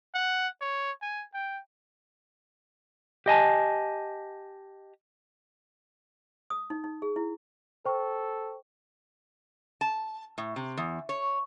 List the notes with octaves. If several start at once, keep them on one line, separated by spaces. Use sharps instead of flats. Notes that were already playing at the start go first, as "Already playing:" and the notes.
F#5
C#5
G#5
G5
G4 D#5 G#5 A5
D#6
D#4
D#4
G#4
E4
A4 C5 G5 C#6
A5
A2
C3
E2
C#5